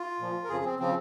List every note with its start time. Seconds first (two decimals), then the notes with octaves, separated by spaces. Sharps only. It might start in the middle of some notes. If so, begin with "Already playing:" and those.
Already playing: F4
0.19 A#2 F3
0.44 A#4
0.49 F2 C#3 F3 G#4
0.64 C4
0.79 C#3 F3 C4